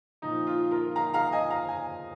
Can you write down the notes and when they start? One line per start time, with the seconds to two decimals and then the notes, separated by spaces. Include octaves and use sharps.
0.22 A#2 F3 D#4
0.47 F4
0.71 F4 A#4
0.96 F5 A#5
1.13 F5 A#5
1.32 D#5 G#5
1.50 F5 A#5
1.69 G#5